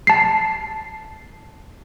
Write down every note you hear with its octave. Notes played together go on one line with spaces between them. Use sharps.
A5 C7